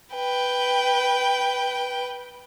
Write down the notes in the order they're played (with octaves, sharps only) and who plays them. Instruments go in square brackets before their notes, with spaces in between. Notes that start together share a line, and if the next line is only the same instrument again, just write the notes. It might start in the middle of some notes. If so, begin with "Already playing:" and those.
[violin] B4 G5